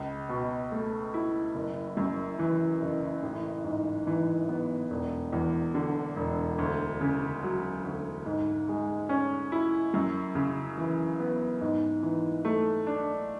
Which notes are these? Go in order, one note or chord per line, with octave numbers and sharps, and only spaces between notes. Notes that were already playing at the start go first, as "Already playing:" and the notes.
Already playing: C#2
B2
A3
E4
F#1
F#2
E3
F#1
A1
G#2
E3
B3
E1
E2
D3
E1
D2
C#3
F#3
D2
G#2
G#3
C#4
E4
F#2
C#3
E3
B3
G#2
E3
A3
D4